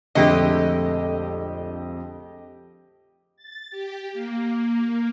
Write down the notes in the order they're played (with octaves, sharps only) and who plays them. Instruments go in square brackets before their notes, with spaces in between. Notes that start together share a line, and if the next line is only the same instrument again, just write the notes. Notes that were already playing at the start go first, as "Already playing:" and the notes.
[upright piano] A#1 F2 [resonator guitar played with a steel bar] D3 G#3 A3 [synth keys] G4 D#5
[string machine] A6
G4
A#3